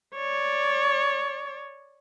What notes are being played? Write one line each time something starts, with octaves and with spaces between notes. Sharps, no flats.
C#5 D5